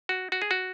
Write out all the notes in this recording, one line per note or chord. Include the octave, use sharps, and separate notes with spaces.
F#4
F#4
G#4
F#4